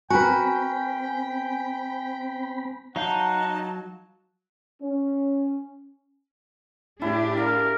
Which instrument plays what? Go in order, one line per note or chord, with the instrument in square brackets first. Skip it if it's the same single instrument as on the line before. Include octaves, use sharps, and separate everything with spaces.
[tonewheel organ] C4 B5 [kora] F#4 A#4 B4 [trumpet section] G5 [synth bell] G#5
[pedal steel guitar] F#3 F5 G6 [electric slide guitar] D#4 [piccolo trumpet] F#5 [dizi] A5
[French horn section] C#4
[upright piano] A2 [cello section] D4 G4 G#4 [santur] E4
[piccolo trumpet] A#4 [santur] F5